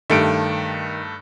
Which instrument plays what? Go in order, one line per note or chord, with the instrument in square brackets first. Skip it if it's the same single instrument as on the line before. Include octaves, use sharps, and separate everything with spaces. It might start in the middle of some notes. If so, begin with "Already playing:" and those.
[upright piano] G2 A3 [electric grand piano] D#3 D7